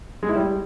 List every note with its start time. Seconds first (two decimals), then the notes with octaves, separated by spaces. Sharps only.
0.23 G#3
0.29 E4
0.36 G3